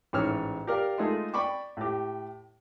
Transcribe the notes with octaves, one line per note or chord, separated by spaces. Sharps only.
A1 G#2 E3 C#5 E6 F6
G4 A#4 D5 F5
G#3 A3 D#4 F4 G#4 A4
D5 G5 B5 C#6 D6
A2 G4